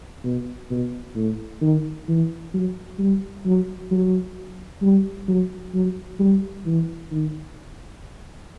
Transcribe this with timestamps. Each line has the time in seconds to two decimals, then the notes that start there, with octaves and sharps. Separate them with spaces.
0.24 B2
0.70 B2
1.16 A2
1.61 D#3
2.08 E3
2.54 F#3
2.99 G3
3.46 F#3
3.91 F#3
4.82 G3
5.28 F#3
5.75 F#3
6.19 G3
6.66 E3
7.11 D#3